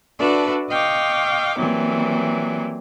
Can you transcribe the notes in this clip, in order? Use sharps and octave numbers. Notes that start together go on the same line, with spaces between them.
D4 F#4 A4 B4 D5 E5
D#5 F5 G5 C#6 D6
E3 F#3 G3 A#3 C4